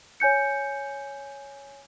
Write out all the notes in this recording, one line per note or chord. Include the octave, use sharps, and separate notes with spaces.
C#5 G#5 G6 C#7